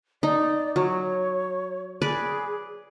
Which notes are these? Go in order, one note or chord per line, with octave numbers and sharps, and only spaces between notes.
D#4 D5
F#3 C#5
G#4 B4 D5